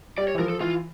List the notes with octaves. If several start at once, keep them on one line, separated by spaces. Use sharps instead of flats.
G3 D5
C#5
E3
F3 A#4
A4
E3 F4